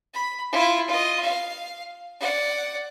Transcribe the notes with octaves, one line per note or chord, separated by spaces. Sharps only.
B5
E4 F4
F4 D#5
F5
D5 F#5